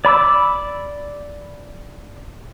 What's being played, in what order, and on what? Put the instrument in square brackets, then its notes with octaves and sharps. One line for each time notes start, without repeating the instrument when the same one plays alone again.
[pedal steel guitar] D5 B5 D6 E6